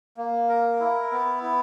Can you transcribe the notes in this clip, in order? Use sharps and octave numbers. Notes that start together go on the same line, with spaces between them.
A#3
A#4
E4
B3
E4